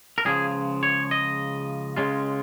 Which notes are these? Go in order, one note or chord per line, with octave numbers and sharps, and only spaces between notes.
A#4
C#2 C#3 F3 G#4
C#5
D#5
C#2 C#3 G#3 F4